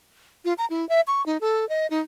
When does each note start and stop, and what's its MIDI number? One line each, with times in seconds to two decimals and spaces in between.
0.45 0.53 65
0.58 0.66 82
0.70 0.87 64
0.89 1.01 76
1.07 1.24 85
1.26 1.38 63
1.41 1.68 69
1.69 1.87 75
1.90 2.01 63